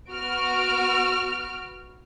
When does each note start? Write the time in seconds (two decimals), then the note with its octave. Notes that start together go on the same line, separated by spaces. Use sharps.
0.10 B3 F#4 F6 D7